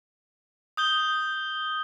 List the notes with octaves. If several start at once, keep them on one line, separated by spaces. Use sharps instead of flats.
D#6 G6 G7